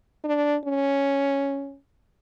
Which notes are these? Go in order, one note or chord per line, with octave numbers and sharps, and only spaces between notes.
D4
C#4